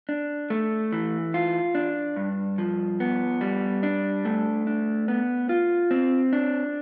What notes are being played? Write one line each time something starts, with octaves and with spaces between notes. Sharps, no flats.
D4
A3
E3
F4
D4
G2
F3
B3
G3
D4
A3
D4
B3
F4
C4
D4